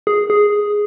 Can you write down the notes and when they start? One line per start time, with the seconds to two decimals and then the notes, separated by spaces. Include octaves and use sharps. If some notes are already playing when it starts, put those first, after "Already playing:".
0.07 G#4
0.30 G#4